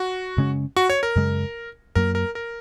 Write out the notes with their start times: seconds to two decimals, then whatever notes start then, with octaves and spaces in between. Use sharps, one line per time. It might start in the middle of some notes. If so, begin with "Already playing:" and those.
Already playing: F#4
0.37 F#2 C#3 G#3 C#4
0.76 F#4
0.90 C#5
1.03 A#4
1.15 F#2 C#3 G#3
1.95 F#2 F#3 A#3 A#4
2.15 A#4
2.35 A#4